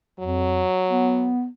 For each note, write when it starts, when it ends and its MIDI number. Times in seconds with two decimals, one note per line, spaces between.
0.20 0.64 41
0.20 1.34 54
0.89 1.47 59